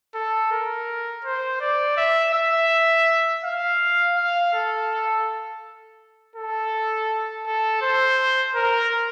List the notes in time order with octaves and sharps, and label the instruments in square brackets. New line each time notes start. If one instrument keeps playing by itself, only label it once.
[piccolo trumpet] A4
A#4
C5
D5
E5
E5
F5
F5
A4
A4
A4
C5
A#4